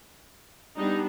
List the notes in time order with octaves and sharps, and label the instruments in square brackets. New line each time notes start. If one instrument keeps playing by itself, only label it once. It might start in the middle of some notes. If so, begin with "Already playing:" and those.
[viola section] G3 B3 D4 D#4